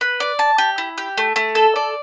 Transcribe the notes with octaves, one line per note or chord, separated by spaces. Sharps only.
B4
D5
A5
G4
E4
G4
A3
A3
A4
D5